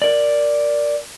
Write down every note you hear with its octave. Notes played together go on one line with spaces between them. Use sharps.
A#4 D5